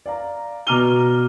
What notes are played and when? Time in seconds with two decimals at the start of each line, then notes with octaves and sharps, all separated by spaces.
0.06 D5 F5 A#5
0.67 B2 A#5 D6 F6 D#7 G7